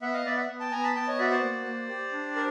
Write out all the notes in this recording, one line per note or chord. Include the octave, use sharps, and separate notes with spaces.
B3 E5 F#5
D#5 F5
B3 D5 E5
E5 F#5
B3
G5 A5
B3 G#5 A#5
A5 B5
B3 G5 A5
C#5 D#5
F#4 D5 E5
C5 D5
A#3
A#3
G4
D4
A#4